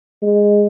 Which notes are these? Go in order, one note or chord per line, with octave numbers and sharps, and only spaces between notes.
G#3